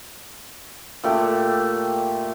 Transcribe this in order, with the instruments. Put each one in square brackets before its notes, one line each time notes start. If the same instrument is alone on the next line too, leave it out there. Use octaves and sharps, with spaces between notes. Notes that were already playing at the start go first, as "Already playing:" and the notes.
[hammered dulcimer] A#2 A3 G4